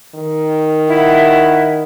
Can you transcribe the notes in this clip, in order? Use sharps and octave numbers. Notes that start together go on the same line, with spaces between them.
D#3
E4 F#5